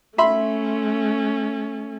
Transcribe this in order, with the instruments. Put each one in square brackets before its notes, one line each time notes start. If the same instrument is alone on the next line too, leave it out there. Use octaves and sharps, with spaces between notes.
[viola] A3 C#4 [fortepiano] E5 B5 C6